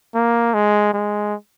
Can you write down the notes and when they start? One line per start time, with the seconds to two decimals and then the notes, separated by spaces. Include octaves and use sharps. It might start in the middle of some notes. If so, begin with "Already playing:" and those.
0.15 A#3
0.54 G#3
0.93 G#3